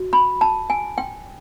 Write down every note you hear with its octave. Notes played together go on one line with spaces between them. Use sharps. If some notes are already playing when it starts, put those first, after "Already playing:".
Already playing: F#4
B5
A5
G#5
G5